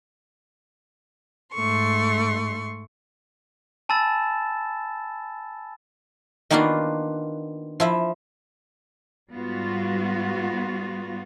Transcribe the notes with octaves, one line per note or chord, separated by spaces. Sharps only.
G#2 A3 C6 C#6
G#5 A5 B5 E6 A6 E7
D#3 A#3 B3 D4 F4 F#4
F3 E4 E5
G#2 G3 B3 F4 F#4